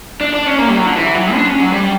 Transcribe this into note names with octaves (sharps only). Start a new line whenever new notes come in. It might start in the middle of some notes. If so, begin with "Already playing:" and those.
D4
D4
C#4
A#3
G3
F#3
D3
E3
F#3
D4
C#4
F#3
G3